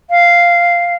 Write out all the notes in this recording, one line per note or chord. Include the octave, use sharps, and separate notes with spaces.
F5